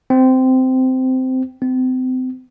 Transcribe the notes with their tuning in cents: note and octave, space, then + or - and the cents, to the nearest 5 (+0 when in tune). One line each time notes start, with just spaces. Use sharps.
C4 -15
C4 -35